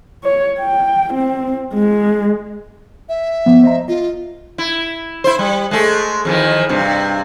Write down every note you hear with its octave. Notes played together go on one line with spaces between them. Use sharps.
C#5
G5
C4
G#3
E5
F3 B3
C5 D#5 A#5
F4 D#5
E4
E4 C5
G3
G#3 A3
F2 D#3 E3
G2 C3